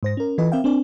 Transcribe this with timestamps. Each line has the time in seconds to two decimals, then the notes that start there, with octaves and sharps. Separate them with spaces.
0.03 G#2 C5 A#6
0.17 C#4 A#4
0.38 E3 F4 A4 B4 D#5
0.52 C4 A#4 E5 F5 G5
0.64 C4 D4 A#4 D5